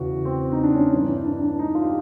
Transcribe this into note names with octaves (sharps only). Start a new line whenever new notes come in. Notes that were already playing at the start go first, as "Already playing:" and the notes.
Already playing: E2 C#3 E3 F#4
C4
D#4
D4
C#4
G2 E3
D4
D4
D#4
F4
G4